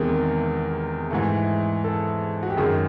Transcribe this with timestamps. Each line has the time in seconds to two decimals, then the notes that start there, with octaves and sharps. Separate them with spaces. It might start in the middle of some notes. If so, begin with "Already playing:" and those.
Already playing: E2 C3 D#3 G#3 A#4
1.11 G#2 E3 A3
1.84 A4
2.43 F#4
2.50 G4
2.57 F#2 D#3 G#3 G#4